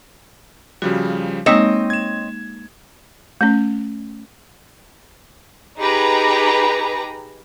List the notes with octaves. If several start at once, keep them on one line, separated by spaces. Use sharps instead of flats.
C#3 F3 G3 F#4
G#3 A#3 C4 D#4 C#5 D#5 G5
G#6 E7
A3 C#4
D#4 G4 G#4 B4 A#5 B5